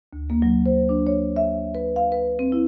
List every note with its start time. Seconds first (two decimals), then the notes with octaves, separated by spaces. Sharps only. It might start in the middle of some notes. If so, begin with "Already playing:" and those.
0.13 D2
0.30 A#3
0.42 F#3
0.66 C5
0.89 D4
1.07 C#5
1.36 E5
1.75 B4
1.96 F5
2.12 B4
2.39 C4
2.52 E4